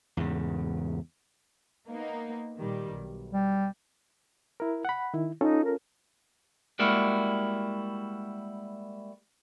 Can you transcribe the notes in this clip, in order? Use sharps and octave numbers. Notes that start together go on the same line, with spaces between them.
E2 G#2 C#3
A#3 B3 D#4
A#2 D#3 G3
B1
G3
E4 A#4
F#5 B5
D#3 E4
C#4 D#4 F4 A4
A#4
G3 G#3 A#3 E4 F#4